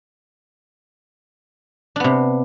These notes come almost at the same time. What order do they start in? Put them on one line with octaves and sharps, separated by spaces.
D4 B3 C3